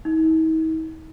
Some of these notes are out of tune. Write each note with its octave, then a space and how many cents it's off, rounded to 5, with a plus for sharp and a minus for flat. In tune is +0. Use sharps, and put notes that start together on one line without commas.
D#4 +45